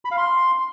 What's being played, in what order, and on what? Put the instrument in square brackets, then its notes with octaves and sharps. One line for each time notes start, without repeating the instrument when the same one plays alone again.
[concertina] B5
F5
C6